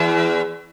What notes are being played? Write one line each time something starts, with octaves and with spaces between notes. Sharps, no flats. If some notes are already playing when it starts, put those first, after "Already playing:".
Already playing: E2